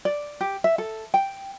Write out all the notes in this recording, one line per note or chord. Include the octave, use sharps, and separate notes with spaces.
D5
G4
E5
A4
G5